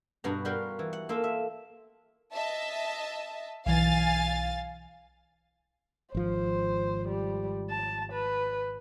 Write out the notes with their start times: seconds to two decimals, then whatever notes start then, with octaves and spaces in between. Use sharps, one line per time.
0.24 G2 B2 F#4 B4 A#5
0.45 G3 F4 F#4 A#4 F5 G5
0.79 E3
0.93 F#5
1.09 A#3 F4 A4 E5
1.24 E5
2.34 D#5 E5 A5
3.66 B1 E3 F5 G#5 A6
6.15 G#1 F3 C5
7.07 G3
7.69 A5
8.12 B4